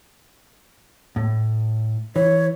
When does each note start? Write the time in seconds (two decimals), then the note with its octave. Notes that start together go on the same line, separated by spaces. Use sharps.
1.16 A2
2.16 E3 C#5